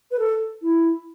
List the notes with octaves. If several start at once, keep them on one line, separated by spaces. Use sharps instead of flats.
B4
A4
E4